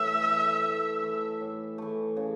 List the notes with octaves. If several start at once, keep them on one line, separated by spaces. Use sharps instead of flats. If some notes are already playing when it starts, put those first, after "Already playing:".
Already playing: A2 E3 A3 E5
E3 A3
A2
E3 A3
A2
E3 A3
C#3